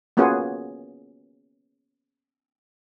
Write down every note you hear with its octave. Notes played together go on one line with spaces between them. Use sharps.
A#3 B3 C#4 F4 F#4 G#4